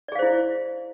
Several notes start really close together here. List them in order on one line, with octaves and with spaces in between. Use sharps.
D5 G#4 F5 C5 E4